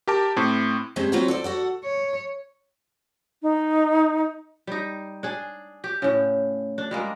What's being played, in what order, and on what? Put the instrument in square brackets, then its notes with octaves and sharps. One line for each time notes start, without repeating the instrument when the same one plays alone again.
[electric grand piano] G4 A#4 A5 D6
A2 C4
[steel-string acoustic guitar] G2 G#3 C4 C#4 C5 E5
F#3 C4 F4 F#4 B4
A4 C5 D5
F#4 A4 F#5
[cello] C#5
[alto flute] D#4
[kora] G3 D#4
D4 G#4
G4
A2 C#3
D4
G3 G#3 A#3